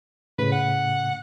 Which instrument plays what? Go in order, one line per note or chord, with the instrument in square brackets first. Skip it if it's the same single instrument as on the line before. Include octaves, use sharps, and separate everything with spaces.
[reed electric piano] A2 C#3 [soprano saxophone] B4
[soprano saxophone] F#5